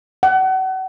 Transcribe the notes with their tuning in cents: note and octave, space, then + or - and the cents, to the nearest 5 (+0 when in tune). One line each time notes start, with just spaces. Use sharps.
F#5 +35